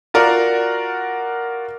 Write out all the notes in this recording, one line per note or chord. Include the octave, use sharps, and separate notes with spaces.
F4 F#4 A#4 D5 F#5